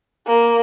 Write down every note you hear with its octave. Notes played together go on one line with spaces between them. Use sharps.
A#3